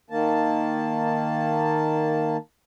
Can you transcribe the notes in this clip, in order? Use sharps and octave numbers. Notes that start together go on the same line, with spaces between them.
D#3 A#3 A5